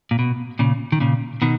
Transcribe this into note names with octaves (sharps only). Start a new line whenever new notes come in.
A#2
B2
A#2 C#3
D#3
A#2 C#3
B2 D#3